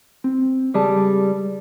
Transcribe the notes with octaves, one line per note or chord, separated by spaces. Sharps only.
C4
C#2 G3 G#4 D5 A5